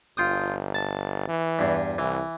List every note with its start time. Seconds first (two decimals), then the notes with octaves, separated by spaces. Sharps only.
0.17 G1 F4 G5 D#6
0.75 A5
1.28 E3
1.59 E2 G2
1.98 C2 E3